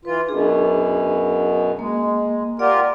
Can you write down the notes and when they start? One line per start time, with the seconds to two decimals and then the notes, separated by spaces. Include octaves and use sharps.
0.05 E3 F4 B4
0.28 F#2 B2 D4 G#4
1.79 G#3 A#3
2.59 F4 G4 A#4 D5 F#5